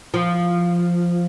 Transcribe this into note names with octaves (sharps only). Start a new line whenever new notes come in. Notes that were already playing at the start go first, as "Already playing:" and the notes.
F3